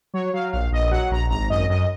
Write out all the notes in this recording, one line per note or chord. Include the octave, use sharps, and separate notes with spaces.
F#3 C#5
F#3 F5
A#1 F5
A#1 D#5
F#3 F#5
A#1 A#5
G#1 A#5
F#2 D#5
F#2 D#5